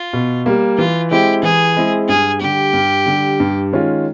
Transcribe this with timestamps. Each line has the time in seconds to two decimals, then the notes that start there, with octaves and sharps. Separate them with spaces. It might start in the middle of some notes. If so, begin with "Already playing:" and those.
Already playing: F4
0.13 B2
0.46 G3 A#3
0.78 E3 F4
1.11 G#3 C4 E4 G4
1.43 E3 G#4
1.76 G#3 C4 E4
2.08 G2 G#4
2.41 D3 G3 G4
2.73 G2
3.06 D3 G3
3.40 G2
3.72 D#3 G#3 C#4 F4